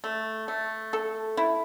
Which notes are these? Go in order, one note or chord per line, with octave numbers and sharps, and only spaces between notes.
A3
A3
A4
E4